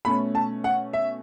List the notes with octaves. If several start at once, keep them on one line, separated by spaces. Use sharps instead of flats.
B2 A3 C#4 B5
A5
F#5
E5